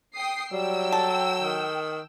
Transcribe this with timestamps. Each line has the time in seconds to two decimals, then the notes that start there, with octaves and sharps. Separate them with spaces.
0.14 G5 D#6 C7
0.53 F#3 G3 G5 E6
0.92 A4
1.41 D#3